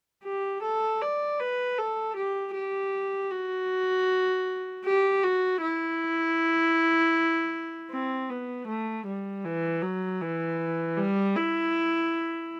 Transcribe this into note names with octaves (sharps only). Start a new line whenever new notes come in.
G4
A4
D5
B4
A4
G4
G4
F#4
G4
F#4
E4
C4
B3
A3
G3
E3
F#3
E3
G3
E4